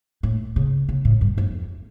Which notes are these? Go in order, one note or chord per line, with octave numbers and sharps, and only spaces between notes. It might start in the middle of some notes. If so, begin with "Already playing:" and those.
A2
C#3
C#3
A2
G2
F2